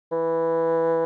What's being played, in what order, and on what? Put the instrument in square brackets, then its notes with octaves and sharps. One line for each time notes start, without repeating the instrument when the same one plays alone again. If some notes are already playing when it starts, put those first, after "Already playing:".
[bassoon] E3